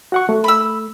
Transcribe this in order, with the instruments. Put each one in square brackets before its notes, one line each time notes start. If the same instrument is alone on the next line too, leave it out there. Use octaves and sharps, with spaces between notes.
[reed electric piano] F#4 F#5 C#6
A3
[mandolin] B5 E6